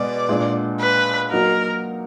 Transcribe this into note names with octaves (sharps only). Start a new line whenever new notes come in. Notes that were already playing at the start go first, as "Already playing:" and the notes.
Already playing: B2 G#3 B3 D5
A#2 G#3 D4
B4
F#3 A#3 D#4 F#4 A#4